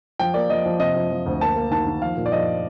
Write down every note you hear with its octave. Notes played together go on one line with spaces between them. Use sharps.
F3 G5
A#3 D5
F3 D#5
F3
C3 D#5
F3
F3
D2
A#3 A5
A#3
D#3 A5
D#3
F3 F5
A#2
D5
F3 D#5